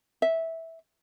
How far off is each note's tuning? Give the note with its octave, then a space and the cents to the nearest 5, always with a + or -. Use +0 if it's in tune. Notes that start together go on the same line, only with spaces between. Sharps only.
E5 -10